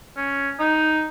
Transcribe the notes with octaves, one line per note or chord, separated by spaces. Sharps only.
C#4
D#4